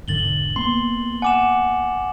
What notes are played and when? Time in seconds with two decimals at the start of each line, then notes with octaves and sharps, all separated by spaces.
0.08 E1 G#2 D3 A6 F#7 G7
0.56 A#3 B3 C6
1.22 F#5 G#5 D6 E7